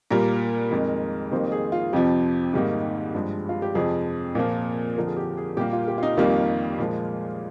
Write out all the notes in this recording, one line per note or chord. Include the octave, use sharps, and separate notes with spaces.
A#2 G3 A#3 A#4
F2 D#3 G#3
F2 D#3 G3 A#3 C5
G#4
F4
F2 C3 F3 G4
G#2 D#3 G3 A#3
G2 F3 G#3
F4
G4
F2 C3 F3 G#4
A#2 F3 A#3
F2 D3 F3 A#4
G#4
G4
G#4
A#2 G3 A#3 G4
F4
G4
F4
D#4
F2 D#3 G3 A#3 F4
A#2 F3 G#3